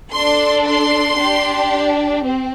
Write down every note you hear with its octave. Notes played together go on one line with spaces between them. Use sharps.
D4 A4 C6
C6
D4 G4
C4